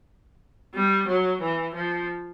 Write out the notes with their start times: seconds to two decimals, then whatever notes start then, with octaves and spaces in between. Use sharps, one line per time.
0.75 G3
1.08 F#3
1.41 E3
1.75 F3